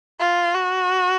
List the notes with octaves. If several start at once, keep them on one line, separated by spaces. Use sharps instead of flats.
F4
F#4